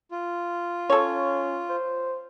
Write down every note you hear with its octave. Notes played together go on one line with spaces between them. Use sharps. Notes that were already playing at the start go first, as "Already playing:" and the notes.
F4
C#4 A4 C#5
C5